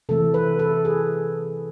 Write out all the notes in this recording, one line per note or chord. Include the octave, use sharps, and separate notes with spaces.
C3 E3 A3 A4
B4
A4
G#4